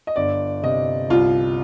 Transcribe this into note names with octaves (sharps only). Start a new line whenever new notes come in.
D#5
G1 D5
C3 D#5
C2 F4